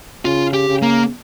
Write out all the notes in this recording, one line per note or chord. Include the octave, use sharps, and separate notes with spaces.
C#3 F4
G4
C#3
A#3